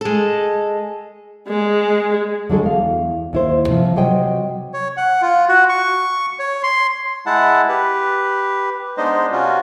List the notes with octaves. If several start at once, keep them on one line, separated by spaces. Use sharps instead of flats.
G#3 A4
G#3
D3 F#3 G#3 A4
E2 F5
D#2 E4 C5
C3 F3
C3 F#3 C5 D#5 G5
C#5
F#5
F4
F#4
C#6
C#5
C6
G#3 E4 F#5 A5
G4 B4
G#3 B3 D4 D#4 C5 D#5
C3 C#4 F4 F#4